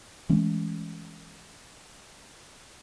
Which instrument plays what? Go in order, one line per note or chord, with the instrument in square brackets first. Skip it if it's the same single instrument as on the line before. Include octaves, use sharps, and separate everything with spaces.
[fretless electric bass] E3 G#3 A3 C#4